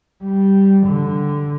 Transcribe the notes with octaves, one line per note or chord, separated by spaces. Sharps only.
G3
D3